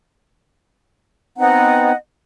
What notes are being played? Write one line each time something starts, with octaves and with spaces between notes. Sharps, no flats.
B3 C4 D#4 D#5 F#5